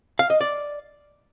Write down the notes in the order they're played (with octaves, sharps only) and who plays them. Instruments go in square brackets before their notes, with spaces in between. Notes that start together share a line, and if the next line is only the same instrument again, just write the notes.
[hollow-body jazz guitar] F5
D#5
D5